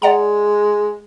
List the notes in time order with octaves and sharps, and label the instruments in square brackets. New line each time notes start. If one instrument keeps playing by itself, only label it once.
[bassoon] G#3 [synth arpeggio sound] D5 F#5 A#5